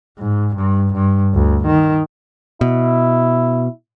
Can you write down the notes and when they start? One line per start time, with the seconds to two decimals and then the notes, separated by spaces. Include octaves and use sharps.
0.19 G#2
0.56 G2
0.94 G2
1.35 D2
1.66 D#3
2.61 B2 E4